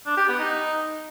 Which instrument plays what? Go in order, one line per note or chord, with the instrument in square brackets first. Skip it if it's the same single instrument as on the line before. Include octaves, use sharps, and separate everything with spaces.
[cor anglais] D4
G4
B3
D#4